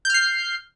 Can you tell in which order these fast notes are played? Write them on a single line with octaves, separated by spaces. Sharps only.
G6 F6 C7